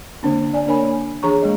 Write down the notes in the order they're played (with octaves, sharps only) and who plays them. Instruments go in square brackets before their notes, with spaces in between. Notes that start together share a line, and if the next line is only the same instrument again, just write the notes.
[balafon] D3 A#3 C4 D4
D5 G#5
A#3 D4 A#4 C#5 G#5 B5
A#3
E3 D4 G#4 C#5 A#5 C#6
G#3 A#3 D#5